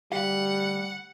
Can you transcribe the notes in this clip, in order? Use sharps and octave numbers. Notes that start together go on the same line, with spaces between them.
D2 G3 G4 F5 F#5